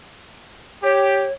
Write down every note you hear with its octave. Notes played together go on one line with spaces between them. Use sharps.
G4 C#5